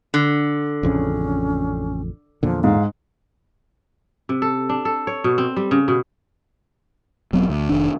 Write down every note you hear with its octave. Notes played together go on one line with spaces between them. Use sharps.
D3
A1 F2 C#3 C#4
E2 A#2 D3 F3
G#2 F5
C3
A4
D4
A4
C#5
B2
C4
G3
C#3
B2
E1 F#3 B3 C4
D2
F1 D#3 D4